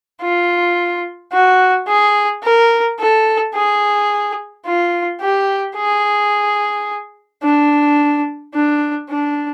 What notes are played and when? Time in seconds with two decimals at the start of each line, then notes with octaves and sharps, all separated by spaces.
0.21 F4
1.33 F#4
1.88 G#4
2.43 A#4
2.99 A4
3.55 G#4
4.66 F4
5.21 G4
5.76 G#4
7.43 D4
8.54 D4
9.10 D4